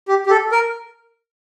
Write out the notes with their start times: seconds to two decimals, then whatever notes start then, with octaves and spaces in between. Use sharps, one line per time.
0.08 G4
0.26 G4
0.30 A4
0.52 A#4